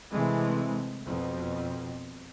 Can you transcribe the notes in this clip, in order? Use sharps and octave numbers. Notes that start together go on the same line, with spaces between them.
C3 E3 G#3 A3 C4
F2 B2